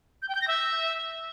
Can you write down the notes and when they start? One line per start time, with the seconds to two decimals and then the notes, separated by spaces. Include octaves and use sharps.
0.22 G6
0.29 G5
0.35 G6
0.41 A#6
0.48 E5